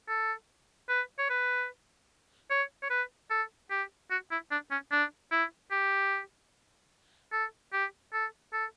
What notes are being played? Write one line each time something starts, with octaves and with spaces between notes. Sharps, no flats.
A4
B4
C#5
B4
C#5
C#5
B4
A4
G4
F#4
E4
D4
C#4
D4
E4
G4
A4
G4
A4
A4